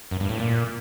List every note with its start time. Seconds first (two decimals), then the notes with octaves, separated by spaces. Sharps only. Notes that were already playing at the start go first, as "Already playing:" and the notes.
0.11 F#2
0.20 G2
0.29 A2
0.38 A#2